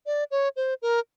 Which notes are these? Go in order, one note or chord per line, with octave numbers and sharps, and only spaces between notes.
D5
C#5
C5
A#4